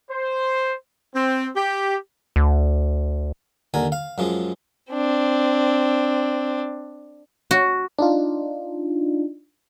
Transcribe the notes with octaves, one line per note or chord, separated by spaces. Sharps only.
C5
C4
G4
D2
D#2 D3 A#4 G#5
F5
F#2 F3 G#3
C4 D4
F#4
D4 D#4 F4